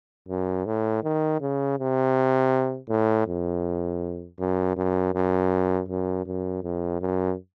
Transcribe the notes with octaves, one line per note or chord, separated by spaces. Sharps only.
F#2
A2
D#3
C#3
C3
A2
F2
F#2
F#2
F#2
F#2
F#2
F2
F#2